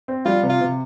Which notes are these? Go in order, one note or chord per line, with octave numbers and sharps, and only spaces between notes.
C4
G3 F4
C3
F4
C3